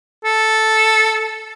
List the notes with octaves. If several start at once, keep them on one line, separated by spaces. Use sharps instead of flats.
A4